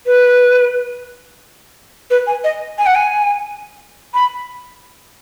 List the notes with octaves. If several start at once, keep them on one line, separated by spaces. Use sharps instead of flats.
B4
B4
G#5
D#5
G#5
F#5
G#5
B5